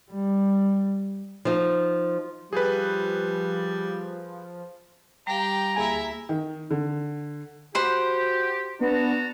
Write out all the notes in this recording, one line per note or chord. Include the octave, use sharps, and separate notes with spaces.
G3
F3 D#4
F3 G3 G#4 B4
G3 G4 F5 G5 A#5
D2 A#3 E4 G#4 E5 G#5
D#3
D3
F#4 G4 C5 F#5 B5
B3 D4 F#4 A5 A#5